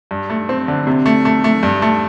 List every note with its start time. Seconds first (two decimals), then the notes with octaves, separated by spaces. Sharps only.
0.11 G2
0.30 A3
0.49 C4
0.68 D3
0.87 C3
1.06 A3
1.25 A3
1.44 A3
1.63 G2
1.82 A3